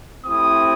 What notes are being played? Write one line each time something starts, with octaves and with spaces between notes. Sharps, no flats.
A3 C4 E4 G4 D#6